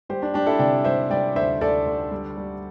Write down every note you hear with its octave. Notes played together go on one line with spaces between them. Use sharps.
G3 G4 C5
D4
G3 D4 G4
E4 A4
C3 D5 G5
G3 C5 E5
G3 D5 G5
D2 C5 E5
D2 A4 D5
D2
G3
G3